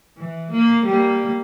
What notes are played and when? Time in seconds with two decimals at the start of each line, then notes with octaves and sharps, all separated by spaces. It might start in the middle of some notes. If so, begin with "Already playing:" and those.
0.18 E3
0.52 A#3
0.85 G3 A#3